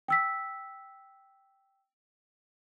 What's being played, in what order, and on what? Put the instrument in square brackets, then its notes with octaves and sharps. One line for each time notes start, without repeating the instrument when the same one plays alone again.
[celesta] G5 E6 B6